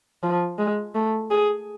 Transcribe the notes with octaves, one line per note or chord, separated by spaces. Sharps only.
F3
G#3
A3
G#4